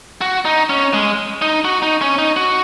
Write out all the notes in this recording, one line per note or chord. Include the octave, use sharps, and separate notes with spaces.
F#4
D#4
C#4
G#3
D#4
F#4
D#4
C#4
D#4
F#4